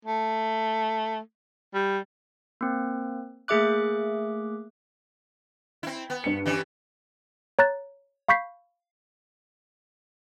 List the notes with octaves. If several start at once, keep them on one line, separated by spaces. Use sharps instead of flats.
A3
G3
A#3 C4
A3 A#3 G#4 E5 D6 F#6
C4 E4
B3
G2 C#7
E3 G3 C#4
C#5 A#5 F#6 A6
F5 B5 C#6 G6 B6 C7